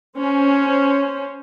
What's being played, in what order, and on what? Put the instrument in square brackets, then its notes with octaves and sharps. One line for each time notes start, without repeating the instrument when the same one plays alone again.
[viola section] C#4 C5